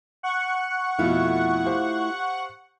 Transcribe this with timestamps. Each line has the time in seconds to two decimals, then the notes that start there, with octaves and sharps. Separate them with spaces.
0.23 F#5 C#6
0.99 F2 B2 A3 E4 F4
1.66 G4 C5 F5